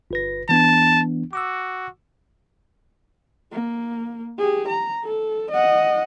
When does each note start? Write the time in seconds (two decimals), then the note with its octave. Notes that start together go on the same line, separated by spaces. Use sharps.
0.11 G1 B4 A#6
0.49 E3 B3 D4 A5
1.33 F#4 D6 E6
3.52 A#3
4.38 G4 G#4
4.68 A#5
5.04 A4
5.51 D#5 F#5